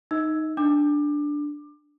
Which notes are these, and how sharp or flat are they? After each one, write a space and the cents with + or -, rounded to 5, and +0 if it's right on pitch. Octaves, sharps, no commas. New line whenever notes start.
D#4 +0 D#5 +40 E6 +0
D4 +0 D6 +25